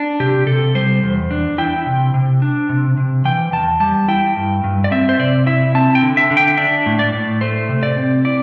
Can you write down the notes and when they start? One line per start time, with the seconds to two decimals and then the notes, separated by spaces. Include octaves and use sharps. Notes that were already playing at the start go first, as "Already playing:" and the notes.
Already playing: D4
0.20 C3 G4
0.46 C3 A4
0.75 G3 C5
1.03 E2
1.31 D4
1.58 E4 G5
1.86 C3
2.14 C3
2.42 D4
2.69 C3
2.97 C3
3.25 E3 G5
3.52 E2 A5
3.80 G3 A5
4.08 E4 G5
4.36 G2
4.64 G2
4.84 D5
4.91 C4 E5
5.09 C5
5.19 C3 D5
5.46 E4 E5
5.75 C4 A5
5.95 G5
6.02 D3
6.17 E5
6.31 D3
6.37 G5
6.57 D4 E5
6.86 A2
6.99 D5
7.13 A2
7.41 A3 C5
7.69 C3
7.83 D5
7.96 C4
8.25 E4 D5